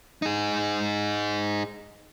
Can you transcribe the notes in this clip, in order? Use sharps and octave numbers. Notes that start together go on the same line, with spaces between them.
D#4 G#4